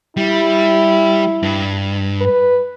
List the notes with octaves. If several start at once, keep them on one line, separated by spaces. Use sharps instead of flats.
G3 E4
G2
B4